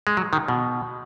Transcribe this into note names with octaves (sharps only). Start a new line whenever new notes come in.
G#3
F#3
D#3
B2